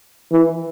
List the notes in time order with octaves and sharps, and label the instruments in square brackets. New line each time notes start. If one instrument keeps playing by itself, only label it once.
[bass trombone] E3